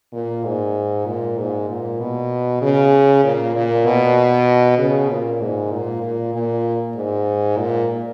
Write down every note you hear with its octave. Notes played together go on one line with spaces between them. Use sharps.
A#2
G#2
A#2
G#2
A#2
B2
C#3
A#2
A#2
B2
C#3
A#2
G#2
A#2
A#2
A#2
G#2
A#2